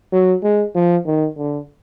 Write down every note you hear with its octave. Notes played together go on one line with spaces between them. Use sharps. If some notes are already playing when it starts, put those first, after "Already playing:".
F#3
G#3
F3
D#3
D3